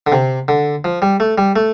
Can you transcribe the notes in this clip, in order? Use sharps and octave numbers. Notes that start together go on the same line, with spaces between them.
D3
C3
D3
F3
G3
A3
G3
A3